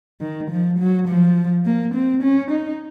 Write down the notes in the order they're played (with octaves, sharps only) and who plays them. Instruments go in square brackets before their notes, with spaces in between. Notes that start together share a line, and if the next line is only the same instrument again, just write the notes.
[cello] D#3
F3
F#3
F3
A#3
C4
C#4
D#4